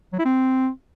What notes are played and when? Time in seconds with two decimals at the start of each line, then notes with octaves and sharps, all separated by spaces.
0.13 F#3
0.19 E4
0.25 C4